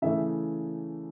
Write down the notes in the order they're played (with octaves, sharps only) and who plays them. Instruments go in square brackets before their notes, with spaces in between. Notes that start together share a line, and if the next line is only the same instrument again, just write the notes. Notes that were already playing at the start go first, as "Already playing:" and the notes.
[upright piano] C#3 E3 A3 E5